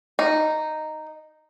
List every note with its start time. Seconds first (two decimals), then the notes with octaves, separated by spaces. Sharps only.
0.19 D#4